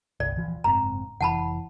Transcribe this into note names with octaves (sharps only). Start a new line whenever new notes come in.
G1 C2 D5
D#1 E3 F3
F#1 G#2 C4 A#5
F1 E3 F#5 A5 B5